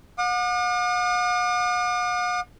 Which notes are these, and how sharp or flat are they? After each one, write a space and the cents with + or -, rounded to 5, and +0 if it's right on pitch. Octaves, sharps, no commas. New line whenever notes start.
F#5 -45 D6 +45